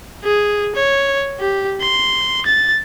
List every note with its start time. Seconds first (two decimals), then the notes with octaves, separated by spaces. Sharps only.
0.24 G#4
0.76 C#5
1.40 G4
1.81 C6
2.46 A6